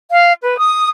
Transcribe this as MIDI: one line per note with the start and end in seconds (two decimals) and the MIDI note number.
0.12 0.33 77
0.42 0.55 71
0.58 0.89 87